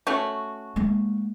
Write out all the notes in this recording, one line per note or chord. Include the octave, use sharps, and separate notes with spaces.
A3 C#4 F#4
G#3 A#3